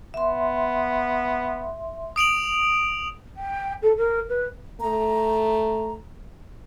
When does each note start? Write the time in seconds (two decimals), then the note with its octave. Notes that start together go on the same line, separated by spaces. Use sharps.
0.14 B3 E5 C6
2.16 D#6 D7 F7 F#7
3.36 G5
3.82 A4
3.96 A#4
4.29 B4
4.80 A3 A#5